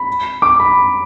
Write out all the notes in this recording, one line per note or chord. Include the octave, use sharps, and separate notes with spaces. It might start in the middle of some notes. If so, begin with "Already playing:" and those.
Already playing: B5
D6
B5